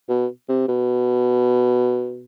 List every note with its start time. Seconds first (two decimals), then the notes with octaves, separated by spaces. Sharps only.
0.09 B2
0.49 C3
0.68 B2